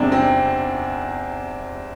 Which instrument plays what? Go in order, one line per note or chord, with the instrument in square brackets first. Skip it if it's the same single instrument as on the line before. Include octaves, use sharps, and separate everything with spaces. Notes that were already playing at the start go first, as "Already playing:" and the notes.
Already playing: [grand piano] E2 C3 G#3 [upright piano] C4 D4
[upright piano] C4